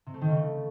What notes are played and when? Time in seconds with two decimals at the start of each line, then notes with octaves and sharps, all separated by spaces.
0.06 C3
0.14 A3
0.21 D#3
0.29 C#3
0.36 A3